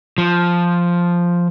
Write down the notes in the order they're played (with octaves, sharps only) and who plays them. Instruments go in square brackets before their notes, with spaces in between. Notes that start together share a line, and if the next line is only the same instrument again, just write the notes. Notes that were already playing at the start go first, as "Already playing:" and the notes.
[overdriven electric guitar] F3